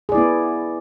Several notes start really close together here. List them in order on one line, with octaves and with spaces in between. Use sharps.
G#4 D5 E4 B3